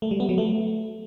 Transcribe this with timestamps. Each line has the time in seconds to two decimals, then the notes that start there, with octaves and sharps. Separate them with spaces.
0.02 A3
0.11 G3
0.20 B3
0.29 F#3
0.38 A3